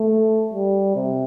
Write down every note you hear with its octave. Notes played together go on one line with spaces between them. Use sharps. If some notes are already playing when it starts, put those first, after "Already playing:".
Already playing: A3
G3
C3